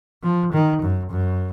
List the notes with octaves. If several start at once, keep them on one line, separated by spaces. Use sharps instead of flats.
F3
D#3
F#2
F#2